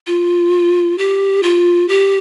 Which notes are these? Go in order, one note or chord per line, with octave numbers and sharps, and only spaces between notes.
F4
G4
F4
G4